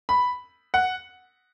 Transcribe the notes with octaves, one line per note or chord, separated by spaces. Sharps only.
B5
F#5